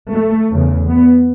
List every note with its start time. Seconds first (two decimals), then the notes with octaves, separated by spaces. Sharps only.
0.13 A3
0.51 E2 C#3
0.89 B3